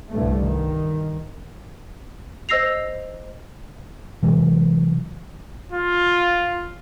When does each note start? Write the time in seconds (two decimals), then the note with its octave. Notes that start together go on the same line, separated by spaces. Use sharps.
0.11 C2 G2 A3
0.42 D#3
2.49 C5 D#5 E6 A#6 C7 F7
4.23 C3 E3 F#3 G#3
5.72 F4